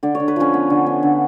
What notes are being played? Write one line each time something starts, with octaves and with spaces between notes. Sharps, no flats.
D3 D5
C#5
D3
B4
F3 C#4 C#5
B3
D3
B3
D3